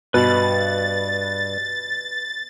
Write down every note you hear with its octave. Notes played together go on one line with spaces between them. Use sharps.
G2 B2 B4 B5 A6